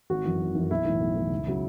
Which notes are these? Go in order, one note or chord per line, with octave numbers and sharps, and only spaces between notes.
G#1 F#4
F#2 E3
G#1
F#2 E3
B1 E4
A2 E3
B1
A2 E3
C#2
C#3 F#3